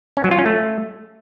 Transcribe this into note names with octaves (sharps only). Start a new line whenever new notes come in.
C#4
F#3
F4
C#4
A3